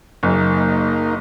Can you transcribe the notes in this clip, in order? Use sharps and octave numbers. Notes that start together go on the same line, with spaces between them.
F#1 A#3 D#4